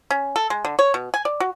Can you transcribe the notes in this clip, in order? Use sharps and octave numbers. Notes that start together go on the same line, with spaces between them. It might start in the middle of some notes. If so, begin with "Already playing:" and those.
C#4
A4
G#3
D3
C#5
B2
G#5
D5
F#4